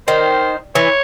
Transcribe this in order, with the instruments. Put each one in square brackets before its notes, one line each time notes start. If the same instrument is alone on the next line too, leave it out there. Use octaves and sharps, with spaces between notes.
[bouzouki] D#3 [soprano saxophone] C5
[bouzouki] E3 [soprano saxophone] C#5